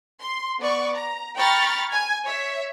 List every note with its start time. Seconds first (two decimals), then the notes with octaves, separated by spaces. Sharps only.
0.21 C6
0.60 B3 D5 C#6
0.94 A#5
1.36 G5 A#5 B5 C#6 F6 A6
1.90 G#5 G#6
2.25 C#5 E5